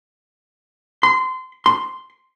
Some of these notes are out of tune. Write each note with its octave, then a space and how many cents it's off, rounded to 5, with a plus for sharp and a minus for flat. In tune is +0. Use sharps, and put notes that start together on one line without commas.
C6 -25
C6 -5